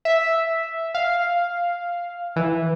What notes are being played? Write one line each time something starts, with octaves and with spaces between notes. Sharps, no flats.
E5
F5
E3